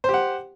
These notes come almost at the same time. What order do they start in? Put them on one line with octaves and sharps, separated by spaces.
C5 G4 F#5